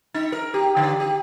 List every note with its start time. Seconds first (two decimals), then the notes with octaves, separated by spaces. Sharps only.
0.14 D#4
0.32 A#4
0.54 G4
0.77 D3
1.00 G4